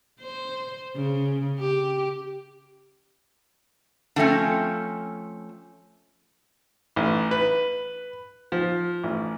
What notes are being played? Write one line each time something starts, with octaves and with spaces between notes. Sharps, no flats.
C5
C#3
G4
D3 F3 A3 C4 C#4
A1
B4
F3
A1